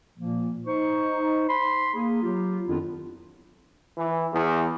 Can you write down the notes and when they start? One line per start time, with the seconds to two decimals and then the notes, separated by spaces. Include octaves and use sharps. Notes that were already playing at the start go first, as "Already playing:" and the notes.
0.17 A#2 F3 A#3
0.66 D#4 C5 C#6
1.49 B5 C6
1.95 A#3 G#4
2.22 F#3 F4 G4
2.67 F2 D#3 B3 D4 E4 F4
3.97 E3
4.32 E2